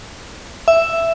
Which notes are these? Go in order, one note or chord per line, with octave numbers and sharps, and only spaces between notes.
E5